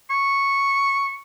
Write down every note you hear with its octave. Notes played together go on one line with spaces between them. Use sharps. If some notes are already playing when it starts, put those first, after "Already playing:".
C#6